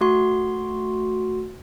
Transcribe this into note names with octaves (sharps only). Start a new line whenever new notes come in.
A3 F#4 C6